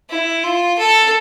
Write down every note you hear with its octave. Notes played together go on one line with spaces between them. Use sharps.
E4
F4
A4